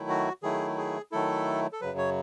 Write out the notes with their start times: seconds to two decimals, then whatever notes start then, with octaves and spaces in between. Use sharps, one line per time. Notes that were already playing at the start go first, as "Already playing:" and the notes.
Already playing: D#3 F#3 A3 E4
0.09 F#4
0.43 D#3 F#3 A3 E4 G#4
0.78 G#4
1.12 D#3 F#3 A3 E4 A4
1.73 A4
1.81 F#2 C#3 F#3 B4
1.98 C#5